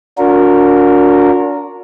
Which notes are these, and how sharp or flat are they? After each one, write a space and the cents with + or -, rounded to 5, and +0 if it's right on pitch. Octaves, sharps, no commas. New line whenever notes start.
D4 -35 F#4 -40 A#4 -10